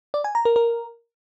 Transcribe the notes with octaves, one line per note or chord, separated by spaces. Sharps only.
D5
G#5
A#5
A#4
A#4